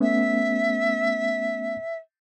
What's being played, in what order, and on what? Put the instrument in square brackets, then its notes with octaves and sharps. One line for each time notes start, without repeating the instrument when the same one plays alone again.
[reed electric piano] A3 B3 C#4 [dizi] E5